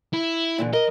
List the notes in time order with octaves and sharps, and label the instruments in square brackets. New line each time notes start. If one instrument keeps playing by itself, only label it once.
[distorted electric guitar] E4
[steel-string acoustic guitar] A#2 D3 E3
[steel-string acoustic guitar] A#4 [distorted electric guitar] D#5